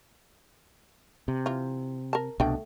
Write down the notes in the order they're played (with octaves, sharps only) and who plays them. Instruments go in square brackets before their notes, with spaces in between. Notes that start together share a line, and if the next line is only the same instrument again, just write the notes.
[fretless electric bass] C3
[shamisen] E3 F4
A#4 A5
[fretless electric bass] C2 B2 D4 [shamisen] A3 G5